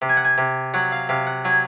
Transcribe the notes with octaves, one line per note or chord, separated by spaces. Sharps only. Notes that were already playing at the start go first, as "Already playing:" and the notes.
C3
G#5
F#5
G#5
C3
F#3 F#5
F5
C3 F5
F#5
F#3 G#5